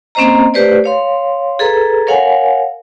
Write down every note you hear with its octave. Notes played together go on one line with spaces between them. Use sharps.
A#3 C4 C#4 C5 D#5 A#5
A3 G4 B4 C5 D5
C#5 F5 C6
G#4 A4 B4 A#5
A#4 C#5 F5 F#5 G#5